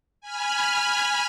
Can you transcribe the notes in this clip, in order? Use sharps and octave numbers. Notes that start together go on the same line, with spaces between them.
G#5 B5 F6